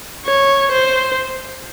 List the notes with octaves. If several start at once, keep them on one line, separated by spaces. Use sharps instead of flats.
C#5
C5